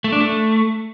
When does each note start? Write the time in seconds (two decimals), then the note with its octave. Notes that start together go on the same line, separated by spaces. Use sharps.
0.04 A3
0.12 D4
0.21 A3